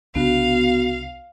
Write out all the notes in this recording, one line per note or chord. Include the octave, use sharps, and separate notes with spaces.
C2 C#3 B3 D4 F#4 F5